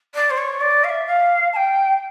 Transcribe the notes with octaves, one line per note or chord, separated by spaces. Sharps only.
D5
C5
C#5
D5
F5
E5
F5
A5
G5